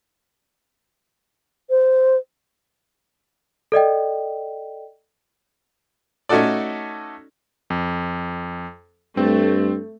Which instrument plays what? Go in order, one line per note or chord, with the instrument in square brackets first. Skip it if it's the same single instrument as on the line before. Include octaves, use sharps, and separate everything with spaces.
[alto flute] C5
[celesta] A4 D5 D#5 G5
[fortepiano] A3 C#4 D#4 F#4 A4 D5
[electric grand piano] F2
[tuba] G2 [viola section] A3 [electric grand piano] C4